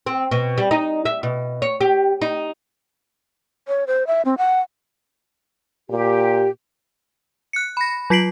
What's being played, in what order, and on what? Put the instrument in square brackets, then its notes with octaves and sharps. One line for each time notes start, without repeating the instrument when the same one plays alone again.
[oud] C4
B2
G3
D#4
E5
B2
C#5
G4
D#4
[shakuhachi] C#5
C5
E5
C4
F#5
[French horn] A#2 [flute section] G4
[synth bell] F#6 C#7
B5 A#6
F#3 F4 B6 C7 D7 F#7